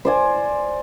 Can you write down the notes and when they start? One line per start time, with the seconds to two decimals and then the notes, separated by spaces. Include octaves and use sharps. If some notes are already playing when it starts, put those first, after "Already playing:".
0.05 C5 D5 G#5